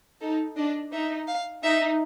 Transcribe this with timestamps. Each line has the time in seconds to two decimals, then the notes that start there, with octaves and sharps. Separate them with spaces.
0.21 D#4 A4
0.56 D4 D#5
0.92 D#4 E5
1.27 F5
1.63 D#4 E5